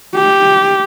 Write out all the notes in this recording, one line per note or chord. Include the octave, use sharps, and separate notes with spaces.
G4